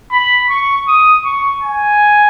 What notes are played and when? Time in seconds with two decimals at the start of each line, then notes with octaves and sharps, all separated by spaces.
0.12 B5
0.50 C#6
0.88 D#6
1.25 C#6
1.63 G#5